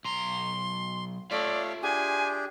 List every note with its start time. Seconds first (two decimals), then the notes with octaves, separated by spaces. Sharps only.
0.05 B1 A#5 C6
1.31 A3 F4 C#5 D5 E5 F5
1.83 D4 G4 G#4 G#5